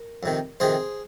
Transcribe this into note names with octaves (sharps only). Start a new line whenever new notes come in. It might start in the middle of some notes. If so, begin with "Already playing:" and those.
Already playing: A#4
F2 C3 D#3
F2 C3 D#3 G#4 C5